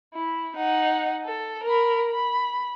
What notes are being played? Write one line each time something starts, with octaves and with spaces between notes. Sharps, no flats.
E4
D#4 F#5
A4
A#4 B5
B5